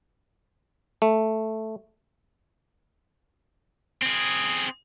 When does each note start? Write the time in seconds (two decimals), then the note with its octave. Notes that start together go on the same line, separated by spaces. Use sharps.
1.02 A3
4.03 C4 G#4